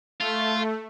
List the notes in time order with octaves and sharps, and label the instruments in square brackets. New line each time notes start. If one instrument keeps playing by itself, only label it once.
[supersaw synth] A3 [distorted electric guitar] F4